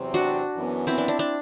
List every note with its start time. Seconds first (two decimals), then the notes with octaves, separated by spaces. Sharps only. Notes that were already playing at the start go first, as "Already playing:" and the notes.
Already playing: E2 C3 F#3 C4
0.14 D4 F#4
0.56 F#2 E3 B3
0.87 C4 E4
0.98 D4
1.08 D4
1.19 D4